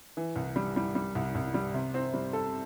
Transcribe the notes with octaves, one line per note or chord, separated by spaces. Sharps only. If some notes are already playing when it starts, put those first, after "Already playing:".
E3
C2
G3
G3
G3
C2
C2
G3
C3
C4
G3
A4